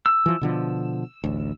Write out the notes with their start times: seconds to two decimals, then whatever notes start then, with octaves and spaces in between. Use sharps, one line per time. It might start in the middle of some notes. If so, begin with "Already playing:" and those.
0.06 E6
0.26 E3 F3
0.41 B2 D3 F3
1.24 A1 D2